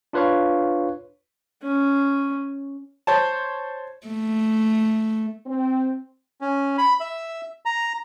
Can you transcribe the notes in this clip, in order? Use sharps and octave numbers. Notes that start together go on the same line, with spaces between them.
D4 F4 B4 C#5 F5 C#6
C#4
C5 C#5 A5
A3
C4
C#4
B5
E5
A#5